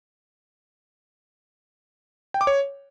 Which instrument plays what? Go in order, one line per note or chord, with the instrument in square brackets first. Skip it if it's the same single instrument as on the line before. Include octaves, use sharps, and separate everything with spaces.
[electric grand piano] G5
D6
C#5